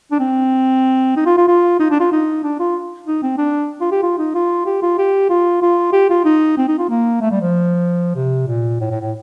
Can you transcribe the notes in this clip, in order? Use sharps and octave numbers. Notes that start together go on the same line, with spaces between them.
D4
C4
D#4
F4
F4
F4
D#4
D4
F4
D#4
D4
F4
D#4
C4
D4
F4
G4
F4
D#4
F4
G4
F4
G4
F4
F4
G4
F4
D#4
C4
D#4
F4
A#3
A3
G3
F3
C3
A#2
A2
A2
A2